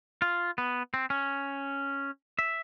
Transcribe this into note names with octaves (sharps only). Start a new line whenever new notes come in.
F4
B3
C4
C#4
E5